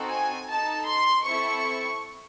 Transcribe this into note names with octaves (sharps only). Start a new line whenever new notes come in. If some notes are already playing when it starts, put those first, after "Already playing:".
Already playing: C4 D#4 F#4 A4
G#5
D#4 A4 A5
C6
C4 E4 A4 C#6